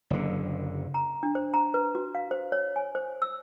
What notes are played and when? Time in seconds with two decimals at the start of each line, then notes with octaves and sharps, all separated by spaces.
0.10 F#1 D3
0.94 A#5
1.23 D4
1.35 C5
1.54 A#5
1.74 B4
1.95 F#4
2.15 F5
2.31 C5
2.52 C#5
2.76 G#5
2.95 C5
3.22 E6